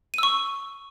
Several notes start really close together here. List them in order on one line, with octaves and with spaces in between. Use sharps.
D#7 E6 C#6